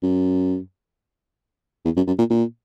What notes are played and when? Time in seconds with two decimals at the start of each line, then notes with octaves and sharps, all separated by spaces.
0.03 F#2
1.85 E2
1.96 F#2
2.07 F#2
2.19 A#2
2.30 A#2